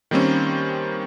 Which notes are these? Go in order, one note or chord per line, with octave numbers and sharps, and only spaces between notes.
D#3 G3 A#3 C4 C#4